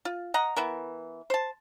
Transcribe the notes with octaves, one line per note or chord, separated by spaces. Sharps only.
F4
D#5 F#5 A#5
E3 B3 A#4
C5 A5